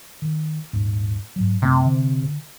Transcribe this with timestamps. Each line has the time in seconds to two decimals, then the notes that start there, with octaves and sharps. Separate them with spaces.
0.22 D#3
0.73 D#1 G#2
1.36 G#2 F#3
1.62 F#2 C3 A3 B3
1.86 D3